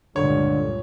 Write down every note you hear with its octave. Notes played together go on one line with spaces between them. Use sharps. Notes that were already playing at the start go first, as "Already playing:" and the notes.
C#2 G2 A#2 D3 C#5